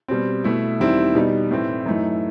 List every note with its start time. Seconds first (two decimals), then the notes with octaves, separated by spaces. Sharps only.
0.08 B2 G3 C4
0.44 B2 A3 E4
0.80 E2 D#3 G3 C4 E4
1.15 B2 G3 D#4
1.51 A2 E3 A3 C4
1.86 F#2 E3 A3 D#4